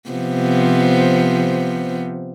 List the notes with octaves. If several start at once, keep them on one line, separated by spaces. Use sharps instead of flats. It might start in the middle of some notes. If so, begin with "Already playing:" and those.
C3 F3 B3